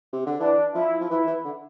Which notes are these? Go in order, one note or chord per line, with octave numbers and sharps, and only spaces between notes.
C3
D3
E3 D4
F3 E4
F3
E3 E4
E3
D3